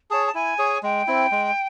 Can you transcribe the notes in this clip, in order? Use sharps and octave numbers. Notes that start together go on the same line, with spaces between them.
G#4 C#5 A5
A5
E4 G#5
G#4 C#5
G#3 G5
C4 E4
G#3